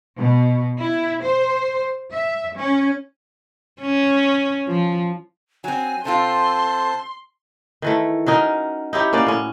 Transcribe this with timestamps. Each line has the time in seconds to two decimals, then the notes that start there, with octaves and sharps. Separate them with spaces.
0.17 B2
0.80 E4
1.24 C5
2.12 E5
2.56 C#4
3.81 C#4
4.68 F3
5.64 F#3 C4 G#5
6.05 C3 C4 F4 A4 C5 A5 C6
7.82 D#3 E3 A3
8.26 F#3 C#4 D#4 A#4
8.93 D#4 E4 G4 C#5
9.13 A#3 C#4 F#4 D5
9.27 A2 C#4